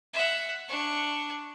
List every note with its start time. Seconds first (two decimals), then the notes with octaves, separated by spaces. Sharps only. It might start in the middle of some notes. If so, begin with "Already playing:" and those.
0.13 E5 F#5
0.68 D4 C#6